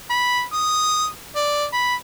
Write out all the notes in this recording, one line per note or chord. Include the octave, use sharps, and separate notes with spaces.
B5
D#6
D5
B5